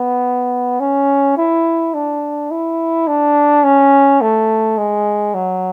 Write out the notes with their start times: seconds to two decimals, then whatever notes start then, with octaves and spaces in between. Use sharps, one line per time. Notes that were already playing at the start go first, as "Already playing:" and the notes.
Already playing: B3
0.80 C#4
1.37 E4
1.94 D4
2.51 E4
3.07 D4
3.64 C#4
4.21 A3
4.78 G#3
5.34 F#3